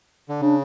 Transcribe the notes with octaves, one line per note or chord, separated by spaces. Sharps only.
D3
C#3 D4